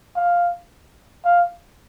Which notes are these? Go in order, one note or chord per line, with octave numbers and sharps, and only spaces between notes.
F5
F5